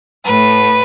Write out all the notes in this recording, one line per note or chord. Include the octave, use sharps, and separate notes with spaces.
A2 A3 B4